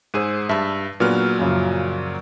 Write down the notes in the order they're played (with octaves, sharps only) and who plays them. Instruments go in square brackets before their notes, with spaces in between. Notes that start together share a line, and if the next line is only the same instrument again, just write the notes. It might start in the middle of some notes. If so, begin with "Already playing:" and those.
[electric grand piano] G#2 G#4 [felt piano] C5 E6 D#7
[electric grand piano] G2 [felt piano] E5 A5 E6
[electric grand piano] A#2 F#3 F6 [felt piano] B3 D4 G#4
[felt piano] F#2 C#3 F3